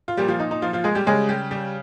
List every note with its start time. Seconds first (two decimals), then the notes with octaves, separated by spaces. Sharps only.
0.08 F4
0.17 A#2 F3 G3 G4
0.28 F3 F4
0.40 D#4
0.51 D#4
0.62 F3 F4
0.73 F3 F4
0.84 G#3 G#4
0.95 G3 G4
1.06 C#3 G3 G#3 G#4
1.29 G3 G4
1.51 G3 G4